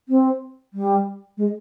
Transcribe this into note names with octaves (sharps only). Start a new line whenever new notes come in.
C4
G3
G#3